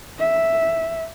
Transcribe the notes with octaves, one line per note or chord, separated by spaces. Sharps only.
E5